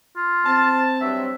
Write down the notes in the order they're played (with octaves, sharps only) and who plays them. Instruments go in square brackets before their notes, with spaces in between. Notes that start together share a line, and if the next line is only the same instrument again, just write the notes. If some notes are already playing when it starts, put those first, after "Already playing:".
[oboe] F4
[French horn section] C4 [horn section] A5
[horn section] G2 F#3 [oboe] E5